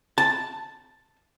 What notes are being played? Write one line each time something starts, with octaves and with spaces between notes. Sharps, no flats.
A5